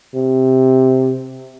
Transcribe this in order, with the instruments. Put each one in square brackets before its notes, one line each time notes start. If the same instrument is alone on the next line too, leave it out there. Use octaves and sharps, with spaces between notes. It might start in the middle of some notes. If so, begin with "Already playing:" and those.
[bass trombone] C3